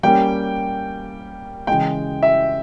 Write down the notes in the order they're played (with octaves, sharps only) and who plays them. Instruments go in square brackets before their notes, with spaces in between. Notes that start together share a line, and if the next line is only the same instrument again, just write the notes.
[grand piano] G3 A#3 C#4 [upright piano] G5
[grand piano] C#3 E3 G#3 [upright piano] G5
[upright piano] E5